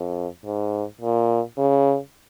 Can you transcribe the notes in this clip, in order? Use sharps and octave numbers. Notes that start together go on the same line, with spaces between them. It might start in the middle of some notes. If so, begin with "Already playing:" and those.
Already playing: F2
G#2
A#2
C#3